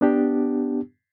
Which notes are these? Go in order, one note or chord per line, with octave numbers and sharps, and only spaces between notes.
B3 D4 G4